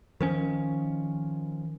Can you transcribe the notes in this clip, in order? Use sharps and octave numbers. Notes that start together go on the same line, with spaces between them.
D#3 F3 C#4